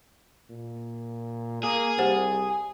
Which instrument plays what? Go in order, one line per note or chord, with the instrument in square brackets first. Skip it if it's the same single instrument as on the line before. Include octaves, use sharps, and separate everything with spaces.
[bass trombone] A#2
[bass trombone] A#3 [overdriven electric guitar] G#4
[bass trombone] C2 [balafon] G4 C5 F#5